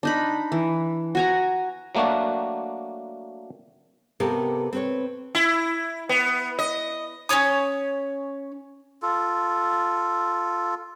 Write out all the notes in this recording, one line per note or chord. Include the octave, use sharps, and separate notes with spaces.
D4 D#4 B5
E3
F#4 G#5 A#5
F#3 A3 A#3 D4 F#4
C3 B3 G4 A4 A#4 F5
C4 B4 C#5
E4
B3
D#5
C#4 F4 C#5 D#6
F4 A4